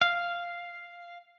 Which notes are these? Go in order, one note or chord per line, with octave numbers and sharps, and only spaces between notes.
F5